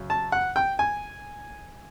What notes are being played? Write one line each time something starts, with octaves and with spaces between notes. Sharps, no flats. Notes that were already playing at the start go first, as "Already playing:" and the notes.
Already playing: F#2 C#3
A5
F#5
G5
G#5